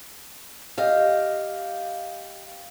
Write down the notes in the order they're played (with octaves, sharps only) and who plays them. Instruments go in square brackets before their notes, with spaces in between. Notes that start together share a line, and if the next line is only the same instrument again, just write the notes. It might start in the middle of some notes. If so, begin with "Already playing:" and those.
[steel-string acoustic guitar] G4 D#5 F5